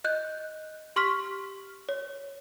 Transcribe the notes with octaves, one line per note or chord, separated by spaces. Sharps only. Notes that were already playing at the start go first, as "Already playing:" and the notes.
D#5 F#6 G6
G4 C6 C#6 F6 B6
C#5